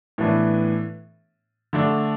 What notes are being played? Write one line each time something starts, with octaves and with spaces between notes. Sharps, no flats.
A2 E3 B3 D4
D3 A3 D4